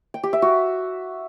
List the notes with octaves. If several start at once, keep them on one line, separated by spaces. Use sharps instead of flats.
G5
G4
E5
F#4